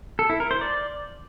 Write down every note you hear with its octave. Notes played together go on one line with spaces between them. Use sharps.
A4
E4
A#4
C5
D5